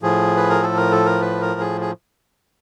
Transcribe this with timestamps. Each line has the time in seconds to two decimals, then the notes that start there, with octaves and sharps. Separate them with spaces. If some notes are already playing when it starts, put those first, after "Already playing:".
0.02 A2 F3 G#4
0.37 B4
0.50 A#4
0.62 A4
0.77 A#4
0.92 A4
1.06 A#4
1.21 B4
1.41 A#4
1.60 G#4
1.81 G#4